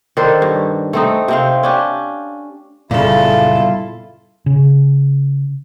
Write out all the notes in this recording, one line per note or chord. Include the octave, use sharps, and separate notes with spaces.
D#3 D4 A4 C5
G2
A3 C4 D#4
C3 C4 F5
C#4 D4 G4
F#1 A#2 C#3 G3 B3 E4 F4 A4
C#3